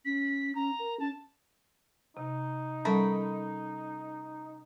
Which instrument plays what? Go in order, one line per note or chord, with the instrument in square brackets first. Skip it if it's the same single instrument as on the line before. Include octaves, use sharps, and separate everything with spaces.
[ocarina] C#4 [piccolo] B6
[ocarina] C#4 [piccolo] A#5
[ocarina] A#4
[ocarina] C#4 [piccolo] A5
[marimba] C3 [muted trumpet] D#4
[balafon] G3 E5 [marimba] C#4 A4 A5 [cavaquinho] A#4 B5